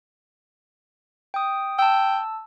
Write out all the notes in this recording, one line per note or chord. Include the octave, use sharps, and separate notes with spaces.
G5 D#6
G5 A5 E6